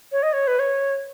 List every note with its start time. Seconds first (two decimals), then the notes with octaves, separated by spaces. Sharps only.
0.12 C#5
0.23 D#5
0.33 C#5
0.47 B4
0.59 C#5